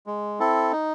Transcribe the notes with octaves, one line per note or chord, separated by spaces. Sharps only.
G#3
C4 E4 A4
D#4